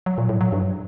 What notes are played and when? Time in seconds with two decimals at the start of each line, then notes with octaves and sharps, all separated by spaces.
0.06 F#3
0.18 A#2
0.29 A2
0.41 F#3
0.52 G2